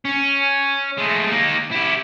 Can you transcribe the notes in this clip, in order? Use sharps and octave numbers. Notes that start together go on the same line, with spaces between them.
C#4
G#3 A3
A#3 D#4
E4 G4